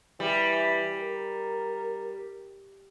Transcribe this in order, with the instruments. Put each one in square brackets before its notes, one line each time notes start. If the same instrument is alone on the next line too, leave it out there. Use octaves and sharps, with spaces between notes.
[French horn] E3 [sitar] G3
[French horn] A#4